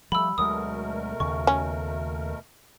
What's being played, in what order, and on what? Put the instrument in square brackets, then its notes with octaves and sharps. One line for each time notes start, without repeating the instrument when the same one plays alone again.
[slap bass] F3 G3 [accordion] A3 [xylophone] B5 E6
[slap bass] D2 F#3 G#3 [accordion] B2 A3 A#4 [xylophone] D#6
[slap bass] D#2 C#3 [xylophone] C#6
[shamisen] C#4